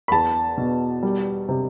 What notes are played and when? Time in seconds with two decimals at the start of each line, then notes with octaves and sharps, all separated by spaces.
0.08 B5
0.11 E2 A5
0.57 B2
1.03 G3
1.49 C3